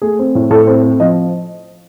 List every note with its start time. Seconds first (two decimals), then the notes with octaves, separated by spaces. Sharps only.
0.02 A3 G#4
0.19 C4
0.35 A2
0.51 A2 A4
0.67 C4
0.83 C4
1.00 F3 D#5